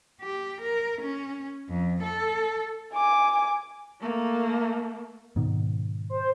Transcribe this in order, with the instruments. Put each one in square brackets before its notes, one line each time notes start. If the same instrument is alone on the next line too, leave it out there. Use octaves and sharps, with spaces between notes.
[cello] G4
A#4
C#4
F2
A4
[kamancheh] G#5 D6
[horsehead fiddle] A3 A#3
[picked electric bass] G#2 B2 D#3
[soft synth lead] C5